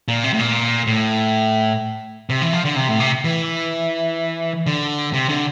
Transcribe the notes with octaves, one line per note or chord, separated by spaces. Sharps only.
A#2
C3
A2
A#2
A2
C3
E3
F3
D3
C3
A2
C3
E3
D3
C3
D3